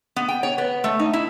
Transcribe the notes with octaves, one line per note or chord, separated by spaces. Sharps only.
B3
G5
C#5
B3
A3
D#4
E4